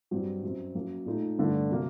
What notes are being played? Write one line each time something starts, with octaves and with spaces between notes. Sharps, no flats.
G2 F#3 C4 G4
F#2 F#3 C4
F#2 F#3 A#3
A#2 A3 D#4
G2 D3 A3
C3 F#3 A#3